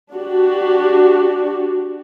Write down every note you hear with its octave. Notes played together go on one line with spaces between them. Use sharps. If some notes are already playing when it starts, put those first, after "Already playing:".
D4 F#4 G4